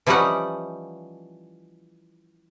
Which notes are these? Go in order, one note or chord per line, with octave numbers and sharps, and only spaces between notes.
E3 F3 G3 C#4 D#4 F#5